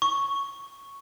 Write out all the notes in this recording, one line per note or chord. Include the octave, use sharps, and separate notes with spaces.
C#6